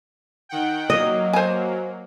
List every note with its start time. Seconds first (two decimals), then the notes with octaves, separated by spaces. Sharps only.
0.49 D#3 F#5 G5
0.90 F#3 A#3 D#5
1.33 C5 G#5